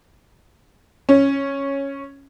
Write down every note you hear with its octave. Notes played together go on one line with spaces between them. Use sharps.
C#4